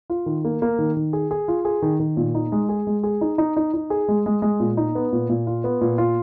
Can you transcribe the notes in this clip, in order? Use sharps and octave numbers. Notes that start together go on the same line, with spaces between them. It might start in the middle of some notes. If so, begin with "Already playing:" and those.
F4
D#3
A#3
A#3
D#3
D#3
G#4
G#4
F4
G#4
D#3
D#3
A#2
D#4
G#3
G#4
G#3
G#4
D#4
D#4
D#4
D#4
G#4
G#3
G#3
G#3
A#2
D#4
B3
A#2
A#2
F4
B3
A#2
F4